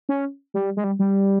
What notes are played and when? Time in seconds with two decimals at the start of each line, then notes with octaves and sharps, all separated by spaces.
0.09 C#4
0.54 G3
0.77 G#3
0.84 G3
0.99 G3